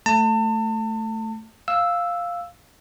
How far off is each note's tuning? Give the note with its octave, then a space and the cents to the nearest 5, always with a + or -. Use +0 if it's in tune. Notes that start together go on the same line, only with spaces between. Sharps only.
A3 +0 A5 +35
F5 +0 E6 +0